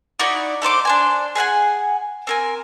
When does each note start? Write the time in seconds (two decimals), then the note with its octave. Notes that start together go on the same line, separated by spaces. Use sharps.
0.20 D#4 E4 F#4 D5
0.62 A3 D#4 C5 D6
0.85 D4 C5 G#5
1.35 G#4 E5 F#5 G#5
2.27 C4 A#4 G#5